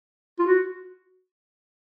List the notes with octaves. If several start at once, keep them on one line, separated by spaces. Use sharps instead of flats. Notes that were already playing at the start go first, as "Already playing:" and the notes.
F4
F#4